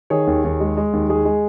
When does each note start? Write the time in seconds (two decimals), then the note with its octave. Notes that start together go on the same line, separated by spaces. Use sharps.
0.10 D#3 G#4 C#5
0.27 D#2
0.44 D#2
0.60 G#3
0.77 G#3
0.93 D#2
1.09 G#3 G#4
1.25 G#3